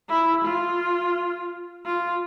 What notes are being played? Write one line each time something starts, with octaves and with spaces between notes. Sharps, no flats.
E4
F4
F4